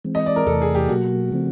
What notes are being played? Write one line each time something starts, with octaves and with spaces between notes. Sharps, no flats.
E3 G#3 C4
D#5
D5
A#4
E2 C3 E3 A3 A4
G#4
G4
B2 F#3 A#3 F#4
C#3 F3 A3 C4